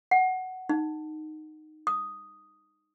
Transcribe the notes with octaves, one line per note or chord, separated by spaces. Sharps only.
F#5
D#4
D#6